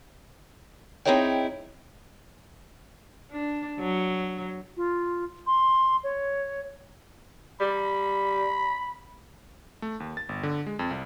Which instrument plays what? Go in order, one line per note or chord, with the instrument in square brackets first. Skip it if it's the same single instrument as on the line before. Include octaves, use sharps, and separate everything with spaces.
[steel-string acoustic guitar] C4 D#4 E4 G#4 C#5 G5
[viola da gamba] D4
F#3
[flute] F4
C6
C#5
[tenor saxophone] G3 [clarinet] B5
[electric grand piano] A3
D#2
A6
G1
D3
G#3
F2
C2